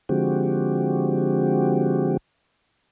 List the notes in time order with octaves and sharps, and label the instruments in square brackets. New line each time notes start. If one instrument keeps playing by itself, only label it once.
[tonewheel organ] D3 F3 G#3 C4 F#4 G4